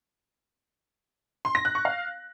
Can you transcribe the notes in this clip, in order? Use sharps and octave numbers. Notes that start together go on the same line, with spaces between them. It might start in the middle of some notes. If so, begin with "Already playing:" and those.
C6
A#6
F#6
C#6
F5